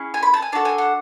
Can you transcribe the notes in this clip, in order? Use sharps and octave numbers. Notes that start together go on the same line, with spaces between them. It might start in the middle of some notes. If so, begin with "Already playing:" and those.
Already playing: C#4 E4 G#4
G#5
B5
A5
G#5
D4 F#4 A4 A5
G#5
F#5